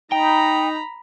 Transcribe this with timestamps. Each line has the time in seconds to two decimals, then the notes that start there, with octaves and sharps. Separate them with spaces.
0.12 D#4 G5 A#5 B5